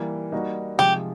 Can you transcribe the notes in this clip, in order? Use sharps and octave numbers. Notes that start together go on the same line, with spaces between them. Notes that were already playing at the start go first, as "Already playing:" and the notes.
Already playing: E3 G3 A#3
G3 A#3 D#4 F#4
C3 F3 G#3 G4